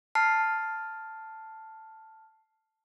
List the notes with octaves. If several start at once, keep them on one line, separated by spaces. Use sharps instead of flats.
A5 F6 C7